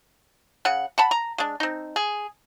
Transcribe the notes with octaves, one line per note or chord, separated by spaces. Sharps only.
C#3 F#5
F#5 A5 B5
A#5
G#3 D4
C4 D#4
G#4